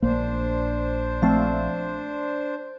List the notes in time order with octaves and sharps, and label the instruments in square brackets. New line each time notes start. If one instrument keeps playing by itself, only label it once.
[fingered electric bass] A#1 A#3 [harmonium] D4 C5
[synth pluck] F3 A3 C4